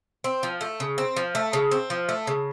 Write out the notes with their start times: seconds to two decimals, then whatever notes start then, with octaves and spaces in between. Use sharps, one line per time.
0.24 C4
0.43 F3
0.61 A3
0.80 C#3
0.98 C4
1.17 F3
1.35 A3
1.53 C#3
1.71 C4
1.90 F3
2.09 A3
2.27 C#3